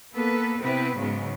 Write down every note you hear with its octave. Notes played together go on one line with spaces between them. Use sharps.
A#3 B3 A4 B4
C3 B3 C4 E4 B4
G#2 C#3 F#3 G#3 B3